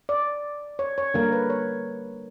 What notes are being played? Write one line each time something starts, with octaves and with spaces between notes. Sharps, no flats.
D5
C#5
C#5
D3 G3 A#3 A#4
B4
C#5